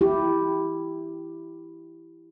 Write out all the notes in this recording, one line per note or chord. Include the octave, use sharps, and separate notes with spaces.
E4 G4